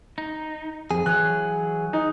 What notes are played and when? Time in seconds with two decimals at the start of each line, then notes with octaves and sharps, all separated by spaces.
0.18 D#4
0.91 F2 G#4
1.06 E3 F#3 C#5 F#6
1.93 D#4